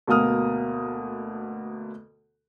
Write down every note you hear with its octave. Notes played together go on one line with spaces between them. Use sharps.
D2 B2 A#3 D#6 F6